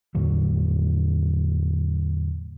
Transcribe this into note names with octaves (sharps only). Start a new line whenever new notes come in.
E2 A2 D3 F#3